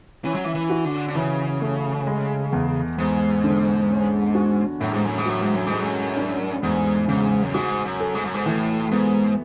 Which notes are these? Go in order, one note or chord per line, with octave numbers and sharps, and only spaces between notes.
E3 C#4
F#3
E3
E3
F#4
D3
D3
C#3 E3
A3
G#3
E2
E2 G#2
D3
C#4
F#4
F#2 A2
G#2
F#2
G#2
F#2 F#3
G#2
F#2
G#2
G#3
F#2
D4
E2 G#2
G#2 C#3
F#2
G#2 F#4
F#2
A4
G#2
F#2
G#2
A2 E3
G#2 B3